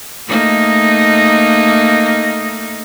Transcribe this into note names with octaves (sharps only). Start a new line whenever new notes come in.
A3 A#3 D#4